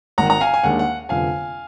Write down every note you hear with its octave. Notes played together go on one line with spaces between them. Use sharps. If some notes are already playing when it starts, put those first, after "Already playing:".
G#1 G#2 D#3 F#5 A#5
A#5
F5 G#5
G#5
D#2 D#3 G#3 D4 F#5
F#5
F1 F2 D3 F3 B3 F5 G#5